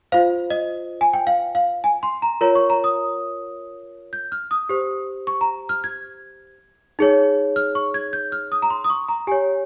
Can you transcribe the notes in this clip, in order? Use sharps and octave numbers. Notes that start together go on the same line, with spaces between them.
F4 C5 F5
D#5
G#5
G5
F5
F5
G#5
C6
A#5
F4 A#4 C#5 A#5
C#6
A#5
D#6
G6
F6
D#6
G4 C5
C#6
A#5
F6
G#6
D#4 G#4 C#5
F6
C#6
G#6
G6
F6
D#6
A#5
C6
D#6
C#6
A#5
G4 C#5 G#5